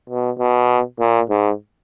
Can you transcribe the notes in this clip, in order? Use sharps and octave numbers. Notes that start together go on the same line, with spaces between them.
B2
B2
A#2
G#2